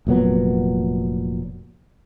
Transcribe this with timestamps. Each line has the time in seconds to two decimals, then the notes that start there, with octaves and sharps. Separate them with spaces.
0.07 F1 A#2 F#3 B3